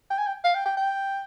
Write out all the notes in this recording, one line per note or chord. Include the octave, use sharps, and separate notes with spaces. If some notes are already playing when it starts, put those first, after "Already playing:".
G5
G#5
G5
F5
G5
G5
G5